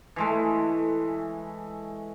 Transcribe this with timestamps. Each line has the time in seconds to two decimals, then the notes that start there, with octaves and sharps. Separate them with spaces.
0.16 E3 G#3 A3